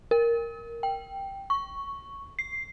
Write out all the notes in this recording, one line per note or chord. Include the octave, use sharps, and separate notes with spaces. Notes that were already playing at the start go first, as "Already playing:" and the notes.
A#4
G5
C#6
C7